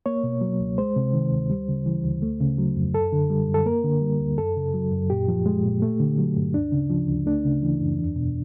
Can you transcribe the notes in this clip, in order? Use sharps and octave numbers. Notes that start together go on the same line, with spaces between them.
A#3 C#5
B2
F#3
C#2
G#3 C5
C3
D#3
D2
G3
C#3
E3
D2
A3
C#3
F#3
F2
F#2 A4
D3
G3
F#2
A4
A#3 A#4
D3
G3
D2
F#2 A4
C#3
F#3
F#2
A#2 G4
F3
G#3
A#2
A3
D3
F#3
G2
D2 D4
C#3
F3
D2
A3 D4
C#3
E3
F#2
E2
B2